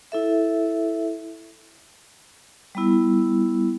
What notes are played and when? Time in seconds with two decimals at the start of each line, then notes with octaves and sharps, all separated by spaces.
0.12 E4 A4 E5
2.75 G3 B3 E4